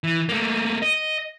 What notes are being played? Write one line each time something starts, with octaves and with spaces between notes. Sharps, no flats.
E3
A3 A#3
D#5